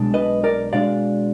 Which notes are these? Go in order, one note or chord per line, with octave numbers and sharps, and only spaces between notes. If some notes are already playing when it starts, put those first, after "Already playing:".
Already playing: B1 B2 G#3 D4
B4 D#5
A#4 D5
B2 G#3 D4 D5 F5